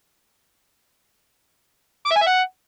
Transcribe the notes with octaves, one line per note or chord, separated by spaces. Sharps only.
D6
E5
G#5
E5
F#5